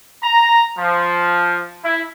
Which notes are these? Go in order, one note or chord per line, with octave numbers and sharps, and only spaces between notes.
A#5
F3
E4